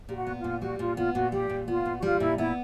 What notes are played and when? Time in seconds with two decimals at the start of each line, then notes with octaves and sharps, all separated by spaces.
0.09 A#2 G4
0.15 F#4
0.27 B3
0.39 F4
0.44 A#2
0.62 G3 F#4
0.79 A#2 F4
0.97 B3 F4
1.15 A#2 F#4
1.32 G3 G4
1.50 A#2
1.68 B3 F4
1.85 A#2
1.99 F#4
2.02 G3 F4
2.20 A#2 E4
2.38 B3 E4